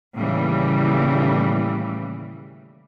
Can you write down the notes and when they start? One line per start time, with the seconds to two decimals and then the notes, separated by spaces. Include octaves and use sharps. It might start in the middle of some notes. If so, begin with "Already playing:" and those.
0.17 D#2 A2 C#3 E3 G3